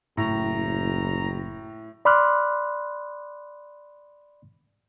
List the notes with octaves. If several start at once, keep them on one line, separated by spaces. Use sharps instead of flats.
F#1 A2 A#5
D5 B5 C6 D6 F6 F#6